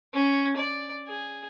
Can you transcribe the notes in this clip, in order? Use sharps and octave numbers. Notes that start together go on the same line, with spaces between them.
C#4
D5
G#4